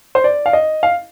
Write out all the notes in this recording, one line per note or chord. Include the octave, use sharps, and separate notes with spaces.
C5
D5
F5
D#5
F5